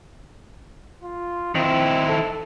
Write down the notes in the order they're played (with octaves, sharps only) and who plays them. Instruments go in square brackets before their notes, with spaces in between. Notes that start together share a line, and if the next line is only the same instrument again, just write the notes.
[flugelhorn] F4
[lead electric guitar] D#3 E4 [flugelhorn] C4
[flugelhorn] A4